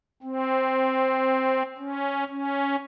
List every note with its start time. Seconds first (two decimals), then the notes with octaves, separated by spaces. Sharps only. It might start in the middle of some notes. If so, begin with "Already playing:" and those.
0.23 C4
1.78 C#4
2.29 C#4